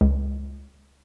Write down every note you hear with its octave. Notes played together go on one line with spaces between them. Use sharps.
C#2